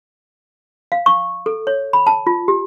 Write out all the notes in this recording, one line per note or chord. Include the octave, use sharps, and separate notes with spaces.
F5
C#6
A4
C#5
B5
A5
F4
G4